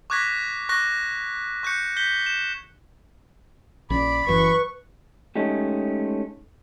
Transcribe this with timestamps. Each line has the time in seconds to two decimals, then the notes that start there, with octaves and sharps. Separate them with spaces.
0.10 C#6 D6 F#6 G#6 A#6 B6
0.69 C#6 F#6 A#6
1.63 C#6 F#6 G6 C#7
1.96 G6 B6 G7
2.26 E7
3.90 A#1 C#4 D5 B5
4.27 F#1 F#2 E3 B4 C#6
5.36 G#3 A3 C#4 D#4 G4